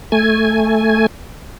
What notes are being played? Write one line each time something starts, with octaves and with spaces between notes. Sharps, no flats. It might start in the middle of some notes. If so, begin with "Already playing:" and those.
A3 G#5